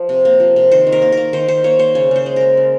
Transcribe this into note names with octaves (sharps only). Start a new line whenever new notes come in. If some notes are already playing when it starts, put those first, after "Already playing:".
Already playing: F3
C3
A#3
F3
C3
D#3 C5
D#3
A#4
A#3
A#4
A#3
D#3 C5
D#3 C5
A#3 C#5
A#3 C5
C#3 C#5
C#3 C5
G#3
G#3 A#4
C#3